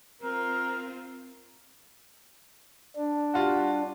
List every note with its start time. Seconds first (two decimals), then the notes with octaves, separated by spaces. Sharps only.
0.22 C4 F4 A#4
2.96 D4
3.34 G3 F4 F#4